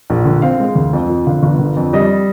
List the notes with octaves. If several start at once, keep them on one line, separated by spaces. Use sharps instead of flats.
A#1
D3
C4 F5
G#3
D2
F2
F3
D3 F5
G1
D3
F2
G3 D#5